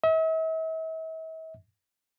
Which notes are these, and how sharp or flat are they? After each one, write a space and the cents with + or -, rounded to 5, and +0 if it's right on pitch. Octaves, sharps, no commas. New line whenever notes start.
E5 -45